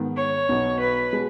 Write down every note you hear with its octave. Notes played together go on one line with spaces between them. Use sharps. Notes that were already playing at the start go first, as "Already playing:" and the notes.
Already playing: G#2 D#3 B3
C#5
B1 B2 B3 D#4
B4
B2 G#3